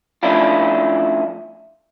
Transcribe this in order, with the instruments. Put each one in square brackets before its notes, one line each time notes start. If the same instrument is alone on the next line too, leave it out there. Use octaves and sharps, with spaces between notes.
[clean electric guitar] F3 A3 C#4 D4 E4 F4